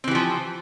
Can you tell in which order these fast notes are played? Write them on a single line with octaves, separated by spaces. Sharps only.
C4 E3 G4 F3